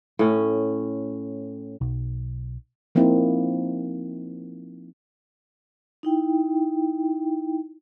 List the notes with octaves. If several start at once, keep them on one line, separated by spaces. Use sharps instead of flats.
A2 C#4
B1
F3 A#3 C4 D#4 E4
D#4 E4 G5